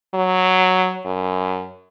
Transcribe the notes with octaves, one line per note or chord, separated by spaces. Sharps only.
F#3
F#2